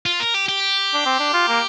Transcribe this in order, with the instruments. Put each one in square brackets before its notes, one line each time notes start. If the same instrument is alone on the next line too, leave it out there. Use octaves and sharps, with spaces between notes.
[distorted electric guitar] F4
A#4
G4
G4
[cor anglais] D4
C4
D4
F4
A#3